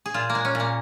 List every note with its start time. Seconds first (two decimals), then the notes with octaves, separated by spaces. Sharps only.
0.06 G#4
0.14 A#2 F4
0.30 A#3
0.35 G#3
0.45 C#4
0.55 A#2
0.60 A#3